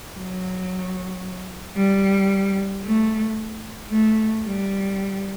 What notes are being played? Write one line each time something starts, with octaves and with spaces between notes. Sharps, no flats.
F#3
G3
A3
A3
G3